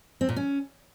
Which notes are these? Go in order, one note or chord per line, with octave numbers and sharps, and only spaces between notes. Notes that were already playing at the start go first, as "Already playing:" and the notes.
C4
A#2
C#4